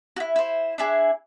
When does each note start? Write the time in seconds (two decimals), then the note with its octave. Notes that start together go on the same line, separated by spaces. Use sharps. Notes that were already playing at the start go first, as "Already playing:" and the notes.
0.16 E4 F#4
0.36 E4 C5
0.78 D4 E4 G#4